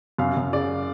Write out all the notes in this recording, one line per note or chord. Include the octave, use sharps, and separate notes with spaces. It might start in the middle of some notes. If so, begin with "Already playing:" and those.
F#2 F5
F#2
C#3 D5